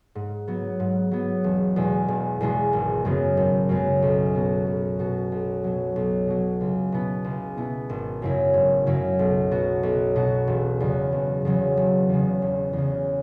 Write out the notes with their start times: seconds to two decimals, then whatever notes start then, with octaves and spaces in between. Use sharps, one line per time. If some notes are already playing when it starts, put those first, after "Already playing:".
0.15 G#2
0.48 F#3 B3
0.80 G#2
1.11 F#3 B3
1.44 E1
1.76 E2 B2 G#3 E4
2.08 E1
2.41 E2 B2 G#3 E4
2.73 G#1
3.05 F#2 C#3 G#3 B3
3.37 G#1
3.69 F#2 C#3 G#3 B3
4.02 B1
4.35 B2 B3 F#4
4.67 B1
4.99 B2 B3 F#4
5.32 B1
5.64 B2 F#3
5.96 B1
6.28 B2 F#3
6.61 C#2
6.92 B2 B3 E4
7.24 C#2
7.57 B2 B3 E4
7.89 G#1
8.22 F#2 C#3 F#3 E4
8.54 G#1
8.87 F#2 C#3 F#3 E4
9.19 B1
9.51 B2 B3 F#4
9.83 B1
10.16 B2 B3 F#4
10.48 E1
10.80 E2 C#3 F#3
11.13 E1
11.45 E2 C#3 F#3
11.77 E1
12.09 E2 C#3
12.42 E1
12.73 E2 C#3